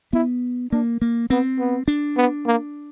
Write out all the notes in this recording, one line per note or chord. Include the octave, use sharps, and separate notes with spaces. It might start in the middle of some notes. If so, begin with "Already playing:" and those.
B3 E4
A#3 D4
A#3
B3 C4
B3
D4
B3
A#3